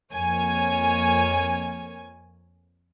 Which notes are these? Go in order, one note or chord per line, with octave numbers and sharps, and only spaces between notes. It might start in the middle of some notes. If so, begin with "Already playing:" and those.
F2 A#3 C#5 G#5 G#6